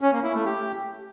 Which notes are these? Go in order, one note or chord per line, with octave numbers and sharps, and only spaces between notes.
C#4
A#3
E4
A3
G4